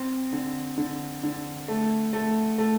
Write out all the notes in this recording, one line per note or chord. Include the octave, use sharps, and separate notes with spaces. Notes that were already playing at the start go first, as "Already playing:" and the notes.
Already playing: C4
D3
D3
D3
A3
A3
A3